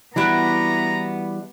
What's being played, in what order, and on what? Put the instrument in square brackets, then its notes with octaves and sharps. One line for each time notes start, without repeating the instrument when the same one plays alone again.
[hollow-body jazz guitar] E3 G3 [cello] B3 [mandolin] D4 E4 F#4 [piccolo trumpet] A#5